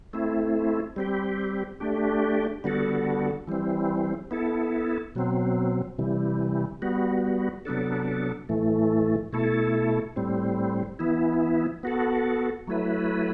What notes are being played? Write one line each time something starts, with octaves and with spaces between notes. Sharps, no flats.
A3 C4 E4
G3 C4 G4
A3 D4 G4
D3 G3 B3 F#4 A4
E3 G3 C4
B3 E4 A4
B2 F#3 C4
C3 E3 G3
G3 B3 F#4
C3 F#3 B3 D4 A4
A2 E3 A3
B2 A3 E4 A4
A2 G3 C4
E3 B3 E4
B3 F#4 A4
F#3 A3 E4 B4